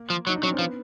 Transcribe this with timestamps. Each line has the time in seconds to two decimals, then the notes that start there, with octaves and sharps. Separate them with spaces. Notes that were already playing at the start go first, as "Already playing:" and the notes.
Already playing: A#3
0.10 F3
0.27 F#3 D#4
0.36 D4
0.43 F#3 C#4
0.52 C4
0.59 F3 B3